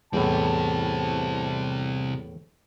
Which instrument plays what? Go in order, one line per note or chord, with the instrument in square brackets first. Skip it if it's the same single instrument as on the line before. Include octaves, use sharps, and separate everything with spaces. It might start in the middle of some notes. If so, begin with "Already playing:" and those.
[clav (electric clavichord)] E2 A2 [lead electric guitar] C3 G3 [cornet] A5